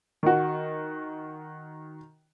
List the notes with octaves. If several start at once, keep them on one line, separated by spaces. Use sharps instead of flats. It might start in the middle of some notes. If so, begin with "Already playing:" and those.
D#3 F#4